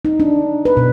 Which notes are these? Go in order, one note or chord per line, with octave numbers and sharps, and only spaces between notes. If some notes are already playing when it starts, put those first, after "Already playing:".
D#4
D4
B4
B2